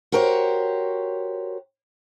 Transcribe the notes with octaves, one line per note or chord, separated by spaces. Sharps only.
F#4 G4 A#4 C5 C#5